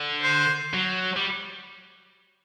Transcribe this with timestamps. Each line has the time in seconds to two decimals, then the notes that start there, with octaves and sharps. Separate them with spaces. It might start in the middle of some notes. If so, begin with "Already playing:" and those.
Already playing: D3
0.22 C5
0.74 F#3
1.16 G3